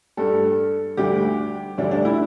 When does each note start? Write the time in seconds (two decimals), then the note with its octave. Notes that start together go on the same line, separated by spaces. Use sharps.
0.17 G2 G3 A4
0.97 D2 D3 G3 G4
1.78 D2 D3 G3 D4
1.91 D4
2.05 E4